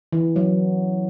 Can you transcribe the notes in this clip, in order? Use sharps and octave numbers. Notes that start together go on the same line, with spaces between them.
E3
F#3